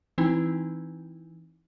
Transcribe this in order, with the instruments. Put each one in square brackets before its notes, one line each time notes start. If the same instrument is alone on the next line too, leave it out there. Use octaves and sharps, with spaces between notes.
[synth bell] E3 C4 D#4 E4